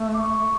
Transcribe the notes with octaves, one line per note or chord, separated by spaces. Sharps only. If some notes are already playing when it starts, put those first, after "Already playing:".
Already playing: A3
D6
C#6